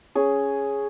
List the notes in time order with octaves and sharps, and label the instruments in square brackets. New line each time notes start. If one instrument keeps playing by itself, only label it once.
[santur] C#4 G#4